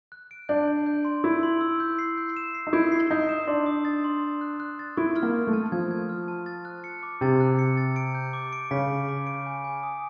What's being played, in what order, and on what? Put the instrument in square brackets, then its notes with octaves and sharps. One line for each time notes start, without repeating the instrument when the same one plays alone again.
[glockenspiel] F#6
D7
[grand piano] D4 [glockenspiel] G6
[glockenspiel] G6
G6
C6
[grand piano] E4 [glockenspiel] E6
[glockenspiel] C6
E6
G6
C7
G6
E7
C7
[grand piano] D#4
[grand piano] E4 [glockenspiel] G6
[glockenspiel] C7
[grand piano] D#4 [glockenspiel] G6
[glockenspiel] E7
[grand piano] D4 [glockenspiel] C6
[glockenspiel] D#6
A6
C6
C6
F#6
F#6
A6
[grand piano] E4 [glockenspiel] C#6
[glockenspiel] F6
[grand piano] A#3
[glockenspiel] C#6
[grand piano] A3
[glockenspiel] A5
[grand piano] F3 [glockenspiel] G#6
[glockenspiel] G#6
F6
A5
A6
F#6
C#7
D6
[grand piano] C3 [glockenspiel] A6
[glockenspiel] F#6
C#7
A6
D7
G6
D6
D7
[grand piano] C#3 [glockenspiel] B6
[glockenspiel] D6
D6
D7
G#5
G#5
D#6